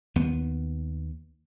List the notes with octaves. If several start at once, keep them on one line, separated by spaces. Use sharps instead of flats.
D#2 B3